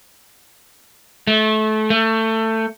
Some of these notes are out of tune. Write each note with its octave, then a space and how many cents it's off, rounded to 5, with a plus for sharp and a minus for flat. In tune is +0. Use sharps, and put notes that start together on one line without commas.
A3 -25
A3 +20